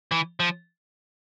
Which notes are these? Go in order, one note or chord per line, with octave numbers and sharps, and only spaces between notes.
E3
F3